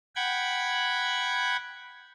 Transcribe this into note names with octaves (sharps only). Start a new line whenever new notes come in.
F#5 G5 B5 G#6